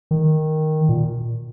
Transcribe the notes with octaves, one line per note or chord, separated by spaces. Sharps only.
D#3
A#2